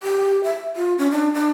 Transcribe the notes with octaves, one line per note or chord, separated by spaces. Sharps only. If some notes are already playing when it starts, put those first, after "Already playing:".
G4
E5
F4
C#4
D4
D4